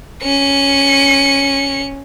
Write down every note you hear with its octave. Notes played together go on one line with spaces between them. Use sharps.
C#4 C#7